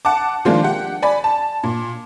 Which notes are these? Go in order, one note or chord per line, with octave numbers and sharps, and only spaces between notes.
F#5 A5 D6
D#3 F3 G#3 A#3 D4 F4
G4 F#5
D5 G#5 B5
A5
A#2